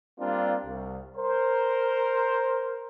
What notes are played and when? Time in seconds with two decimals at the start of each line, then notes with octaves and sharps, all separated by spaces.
0.19 G3 A#3 C4 D4 F4
0.65 C2
1.16 A#4 C5